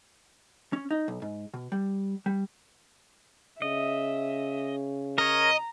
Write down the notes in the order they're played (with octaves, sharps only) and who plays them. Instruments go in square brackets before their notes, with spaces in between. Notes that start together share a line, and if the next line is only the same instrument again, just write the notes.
[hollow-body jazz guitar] C#4
D#4
B1
G#2
B2
G3
G3
[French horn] C#3 [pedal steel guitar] D#5 [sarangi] E5
[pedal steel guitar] A#4 C#5 [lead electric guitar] D#5 [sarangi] A#5